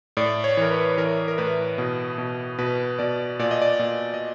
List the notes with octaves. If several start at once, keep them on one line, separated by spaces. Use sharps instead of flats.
A2 D5
C#5
E3 A#4
B4
E3 A#4
A#4
A2 B4
B2
B2
B2 B4
B2 D5
A#2 D5
D#5
D5
A#2 D#5
D#5